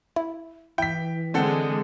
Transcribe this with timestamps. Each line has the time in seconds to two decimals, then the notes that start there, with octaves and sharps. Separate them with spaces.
0.16 E4
0.78 E3 E4 G5 B6
1.34 D3 G#3 C4 A4 F#5